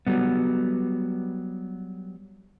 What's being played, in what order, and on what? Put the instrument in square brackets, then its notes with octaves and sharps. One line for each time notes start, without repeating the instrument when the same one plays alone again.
[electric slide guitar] F#3 G3 B3